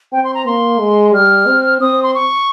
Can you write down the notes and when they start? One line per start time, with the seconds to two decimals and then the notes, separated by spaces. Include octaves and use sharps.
0.12 C4 G5
0.24 C6
0.34 A#5
0.46 A#3 C6
0.80 G#3
1.13 G3 F6
1.47 C4
1.81 C4 D#6
2.03 C6
2.15 C#6